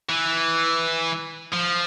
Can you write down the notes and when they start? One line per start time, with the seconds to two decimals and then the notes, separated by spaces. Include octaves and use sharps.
0.09 E3
1.53 F3